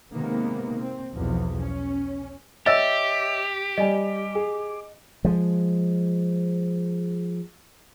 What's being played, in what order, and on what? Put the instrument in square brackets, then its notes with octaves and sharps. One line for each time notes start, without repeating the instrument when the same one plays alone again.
[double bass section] C3 D#3 G#3 A#3 B3
C4
B1 E2 F3
C#4
[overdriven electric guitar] G4 [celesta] C#5 D#5 E5 [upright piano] E6 A6
[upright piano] G3 G#5 [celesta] D#5
[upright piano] G#4
[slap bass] F3 G#3